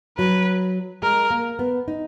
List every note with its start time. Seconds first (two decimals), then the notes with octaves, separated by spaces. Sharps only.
0.18 F#3 B4
1.03 G#3 A#4
1.31 A#3
1.59 B3
1.88 D#4